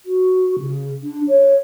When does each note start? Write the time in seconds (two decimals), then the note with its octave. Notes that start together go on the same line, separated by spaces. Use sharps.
0.06 F#4
0.60 C#3
1.03 D4
1.28 C#5